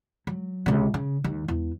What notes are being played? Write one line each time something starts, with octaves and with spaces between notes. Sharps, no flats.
F#3
C#2 C3
C#3
D#2 D#3
E2